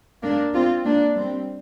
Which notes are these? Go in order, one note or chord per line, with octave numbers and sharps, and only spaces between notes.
A#3 D4
C4 F4
A#3 D4
G3 C4